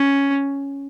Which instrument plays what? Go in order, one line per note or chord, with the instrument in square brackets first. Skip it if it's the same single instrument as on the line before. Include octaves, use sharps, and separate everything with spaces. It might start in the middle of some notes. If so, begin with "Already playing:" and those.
Already playing: [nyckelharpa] C#4